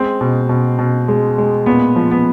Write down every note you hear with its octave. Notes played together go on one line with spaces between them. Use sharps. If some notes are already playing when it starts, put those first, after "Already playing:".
Already playing: G#3 C4
B2
B2
B2
G#3
G#3
A#2 B3
F3
B3